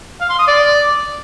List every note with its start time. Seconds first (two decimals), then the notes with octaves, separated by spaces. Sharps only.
0.21 F5
0.30 C6
0.39 D#6
0.48 D5